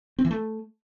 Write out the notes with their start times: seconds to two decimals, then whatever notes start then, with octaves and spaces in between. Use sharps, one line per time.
0.19 C4
0.25 E3
0.31 A3